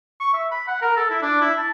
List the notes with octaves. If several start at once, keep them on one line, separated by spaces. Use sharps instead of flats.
C#6
E5
B5
F#5
A#4
A4
E4
D4
E4
A5